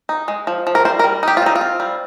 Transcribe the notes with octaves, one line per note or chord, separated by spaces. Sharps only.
D#4
G#3
F3
F3
A#4
G3 C5
A#4
G3
D#4 G4
F4
C4 D#4
F4
C4
G3